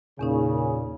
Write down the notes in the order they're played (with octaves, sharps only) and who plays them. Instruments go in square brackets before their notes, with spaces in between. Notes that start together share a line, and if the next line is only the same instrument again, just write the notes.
[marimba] E2 C#4 D#4 [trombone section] A#2 [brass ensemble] C#3